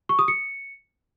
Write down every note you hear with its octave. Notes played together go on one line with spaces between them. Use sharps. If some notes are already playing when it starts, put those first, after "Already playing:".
C#6
D#6
C#7